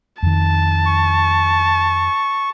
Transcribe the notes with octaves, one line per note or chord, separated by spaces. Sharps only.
F2 D#3 A5
C#6